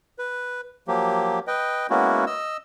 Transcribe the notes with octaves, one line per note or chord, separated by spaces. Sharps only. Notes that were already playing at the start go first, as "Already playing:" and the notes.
B4
F3 F#3 A#3 G4
B4 D#5 G5
G#3 A#3 B3 C#4 E4 F#4
D#5 E6